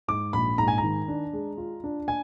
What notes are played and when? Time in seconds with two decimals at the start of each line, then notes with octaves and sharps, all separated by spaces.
0.08 G#2 D6
0.33 A#1 B5
0.58 G#2 A#5
0.68 G#5
0.78 A#5
0.83 D#3
1.08 D4
1.33 G#3
1.58 F4
1.84 D4
2.08 G#5